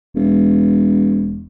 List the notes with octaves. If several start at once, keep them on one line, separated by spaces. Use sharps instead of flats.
E1